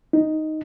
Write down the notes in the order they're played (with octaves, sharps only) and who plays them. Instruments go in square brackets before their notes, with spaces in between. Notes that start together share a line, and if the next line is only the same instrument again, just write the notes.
[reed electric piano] D#4